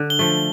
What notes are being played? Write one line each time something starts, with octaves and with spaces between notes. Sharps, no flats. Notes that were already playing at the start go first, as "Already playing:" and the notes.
Already playing: D3
G7
F3 A3